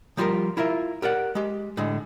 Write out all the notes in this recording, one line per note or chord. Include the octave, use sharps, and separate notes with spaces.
F3 G3 F4 G4 A#4
E4 F4 A#4 E5
G4 A#4 D5 F#5
G#3 G4
A2 D3 G#3